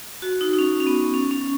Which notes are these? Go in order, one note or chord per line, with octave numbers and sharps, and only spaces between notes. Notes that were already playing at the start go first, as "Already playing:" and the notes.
F#4
D#4
D#4
C#4
C#4
B3
C#4
C#4